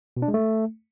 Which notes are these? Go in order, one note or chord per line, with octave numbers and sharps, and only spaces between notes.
B2
D4
G#3
A3